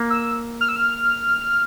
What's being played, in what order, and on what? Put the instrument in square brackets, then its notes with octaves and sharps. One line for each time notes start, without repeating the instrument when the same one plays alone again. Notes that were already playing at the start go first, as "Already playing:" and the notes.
Already playing: [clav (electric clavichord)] A#3
[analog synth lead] E6
F6
E6
F6